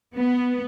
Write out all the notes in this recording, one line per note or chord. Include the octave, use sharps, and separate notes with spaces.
B3